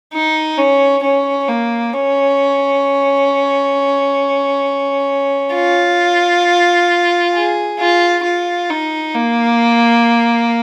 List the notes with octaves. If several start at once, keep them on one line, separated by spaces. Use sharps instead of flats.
D#4
C#4
C#4
A#3
C#4
F4
G#4
F4
F4
D#4
A#3